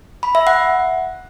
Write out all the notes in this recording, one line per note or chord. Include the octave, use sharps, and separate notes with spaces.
B5
E5
F#5